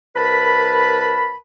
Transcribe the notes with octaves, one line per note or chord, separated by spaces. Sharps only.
C2 A#4 B4 A5 B5